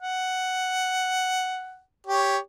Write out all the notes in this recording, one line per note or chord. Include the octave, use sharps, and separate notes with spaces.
F#5
G4 C#5